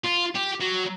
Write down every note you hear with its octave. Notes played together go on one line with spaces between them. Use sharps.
F4
G4
F#3